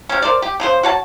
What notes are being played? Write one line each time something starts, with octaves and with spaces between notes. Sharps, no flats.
C3 C#4
A#4 C5 D5
G4
C#3 F3 C5
F#4 C#5 A5